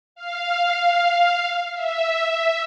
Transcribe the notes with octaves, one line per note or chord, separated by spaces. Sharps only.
F5
E5